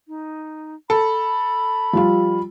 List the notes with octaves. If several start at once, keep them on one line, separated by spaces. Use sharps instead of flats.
D#4
A4 B5
F3 G3 F4